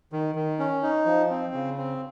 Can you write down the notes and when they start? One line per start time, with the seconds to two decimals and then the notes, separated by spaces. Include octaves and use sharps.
0.12 D#3
0.35 D#3
0.59 C#4
0.83 D#4
1.06 F3
1.30 C4
1.54 C#3
1.78 C4